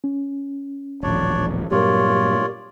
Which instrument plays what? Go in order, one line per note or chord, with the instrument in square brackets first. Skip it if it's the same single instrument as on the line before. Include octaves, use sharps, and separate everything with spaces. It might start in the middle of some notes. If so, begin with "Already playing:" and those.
[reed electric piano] C#4
[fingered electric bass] D#1 A1 F3 [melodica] D4 C#5 D5
[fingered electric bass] G2 A#2 F#3 [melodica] F4 C#5 D5 [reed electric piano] G4 A#4